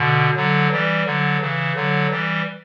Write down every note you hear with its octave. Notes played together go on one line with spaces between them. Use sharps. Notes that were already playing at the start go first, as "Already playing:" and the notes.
Already playing: B2 D3
D3 F#3
E3 G3
D3 F#3
C#3 E3
D3 F#3
E3 G3